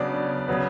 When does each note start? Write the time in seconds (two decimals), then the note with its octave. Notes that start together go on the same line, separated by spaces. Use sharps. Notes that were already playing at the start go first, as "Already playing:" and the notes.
Already playing: C#3 F#3 B3 D4 D5
0.48 C#3 F#3 B3